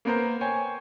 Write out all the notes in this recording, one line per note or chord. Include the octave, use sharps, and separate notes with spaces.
A#3 B3 A#4 C5 A#5
C5 C#5 G5 G#5